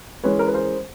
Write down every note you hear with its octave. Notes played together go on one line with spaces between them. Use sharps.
E3 G#3 C#4 B4 C#5
A#4
B4
A#4 C5